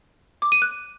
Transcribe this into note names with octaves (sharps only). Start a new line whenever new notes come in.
D6
D#7
F#6